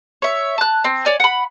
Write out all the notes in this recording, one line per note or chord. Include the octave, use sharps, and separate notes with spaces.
C#5 E5
A5 F#6
C4
C#5 D5 G#5
F#5 B5